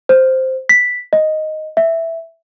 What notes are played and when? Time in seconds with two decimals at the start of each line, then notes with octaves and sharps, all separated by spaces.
0.09 C5
0.69 B6
1.13 D#5
1.77 E5